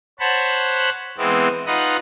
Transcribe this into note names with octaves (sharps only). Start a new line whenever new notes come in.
C5 C#5 F#5 A5 B5
E3 G#3 B3 C4
D#4 F4 B4 D#5 F#5